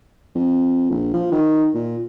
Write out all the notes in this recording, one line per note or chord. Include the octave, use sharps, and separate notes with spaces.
F2
A#1
F3
D#3
A#2